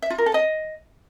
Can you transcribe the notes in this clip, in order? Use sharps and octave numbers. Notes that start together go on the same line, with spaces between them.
E5
F4
A#4
A4
D#5